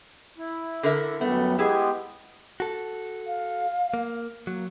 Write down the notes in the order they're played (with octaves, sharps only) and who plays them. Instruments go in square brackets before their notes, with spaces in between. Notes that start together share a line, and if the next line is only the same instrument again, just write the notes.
[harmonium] E4
[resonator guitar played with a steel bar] D3 A#4 E5
[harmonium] F#2 G3 [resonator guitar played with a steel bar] A3 [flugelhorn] B3
[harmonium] G#3 B3 [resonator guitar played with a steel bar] E4 G#4 [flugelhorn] G4
[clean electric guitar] F#4 A4
[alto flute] F5
[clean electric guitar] A#3
[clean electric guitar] F#3 [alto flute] A#3